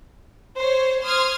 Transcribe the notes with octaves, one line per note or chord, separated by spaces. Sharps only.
C5 C#5
C5 C6 D#6 F6 G#6